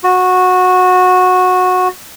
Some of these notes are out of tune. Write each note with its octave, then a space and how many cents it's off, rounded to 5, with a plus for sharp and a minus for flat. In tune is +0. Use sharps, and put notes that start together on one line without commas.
F#4 -15